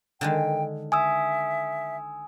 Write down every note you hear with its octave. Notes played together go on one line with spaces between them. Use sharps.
D3 D#3 G#3 G5
E5 G#5 D#6 E6